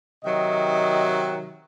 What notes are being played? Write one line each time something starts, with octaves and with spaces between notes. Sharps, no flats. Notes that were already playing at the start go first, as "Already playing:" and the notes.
C3 D#3 F#3 D#5